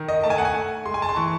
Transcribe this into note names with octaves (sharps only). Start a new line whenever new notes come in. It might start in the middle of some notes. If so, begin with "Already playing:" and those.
Already playing: D#3
D#5
A3 A5
G#5
F#5
G#5
A3
G#3 C6
G#5
A5
C6
E3 C#6